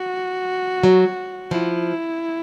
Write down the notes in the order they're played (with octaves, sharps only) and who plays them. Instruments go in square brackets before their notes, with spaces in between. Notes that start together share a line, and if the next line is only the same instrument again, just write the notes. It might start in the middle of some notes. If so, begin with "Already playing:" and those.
Already playing: [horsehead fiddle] F#4
[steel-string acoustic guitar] F#3
[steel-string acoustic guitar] F3 [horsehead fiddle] E4